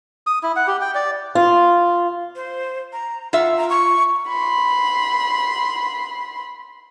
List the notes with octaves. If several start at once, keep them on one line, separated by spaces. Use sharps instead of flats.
D#6
E4
F#5
G4
G5
D5
F4
C5
A#5
F4 E5 F#5
A#5
C#6
B5 C6